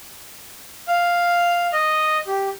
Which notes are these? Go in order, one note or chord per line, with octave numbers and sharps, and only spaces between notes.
F5
D#5
G4